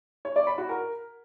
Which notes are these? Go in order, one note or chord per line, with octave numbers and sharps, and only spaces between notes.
C#5
D5
B5
F#4
A#4